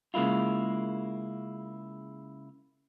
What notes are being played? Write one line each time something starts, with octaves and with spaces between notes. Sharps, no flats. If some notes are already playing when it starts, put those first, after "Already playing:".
C#3 G#3 A#3 E4 F4